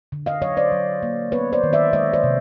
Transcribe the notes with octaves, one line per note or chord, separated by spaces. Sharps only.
D3
D#5 F5
F#3 C#5 D#5
C5 D5
F#3
A#3
B3 B4 C#5
C5 D5
D#3
D5 E5
G#3 C#5 D#5
C5 D5
C3